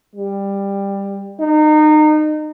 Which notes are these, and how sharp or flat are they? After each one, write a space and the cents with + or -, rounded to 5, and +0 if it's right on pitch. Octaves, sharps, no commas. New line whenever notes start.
G3 +15
D#4 -25